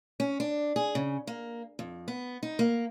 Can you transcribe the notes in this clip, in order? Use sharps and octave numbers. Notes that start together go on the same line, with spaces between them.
C#4
D4
G#4
C#3
A#3
F2
B3
D#4
A#3